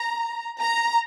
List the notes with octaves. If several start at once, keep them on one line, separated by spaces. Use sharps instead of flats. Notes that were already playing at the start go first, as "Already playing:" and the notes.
Already playing: A#5
A#5